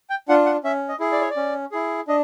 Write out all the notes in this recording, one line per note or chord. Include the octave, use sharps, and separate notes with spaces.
G5
D4 F4 F#5
F#5
C#4 E5
D#5
E4 G#4
D5
C#5
D5
C#4
E4 G#4
D4 D#5